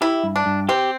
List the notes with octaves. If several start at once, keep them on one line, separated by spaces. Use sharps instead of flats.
E4 G4
G2
D4
G2
C4 G4